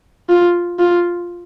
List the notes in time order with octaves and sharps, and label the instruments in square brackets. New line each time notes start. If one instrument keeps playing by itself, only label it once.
[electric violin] F4
F4